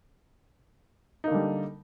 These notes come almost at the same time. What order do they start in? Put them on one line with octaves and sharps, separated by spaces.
D#4 A#3 D3 G3